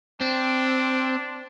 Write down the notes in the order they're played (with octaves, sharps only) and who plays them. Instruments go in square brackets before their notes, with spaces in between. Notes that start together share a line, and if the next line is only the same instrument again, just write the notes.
[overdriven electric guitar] C4 [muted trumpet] D4